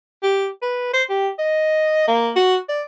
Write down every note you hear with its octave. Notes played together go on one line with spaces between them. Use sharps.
G4
B4
C5
G4
D#5
A#3
F#4
D5